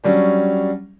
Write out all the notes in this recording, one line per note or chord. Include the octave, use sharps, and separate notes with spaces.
F#3 G3 C#4 D4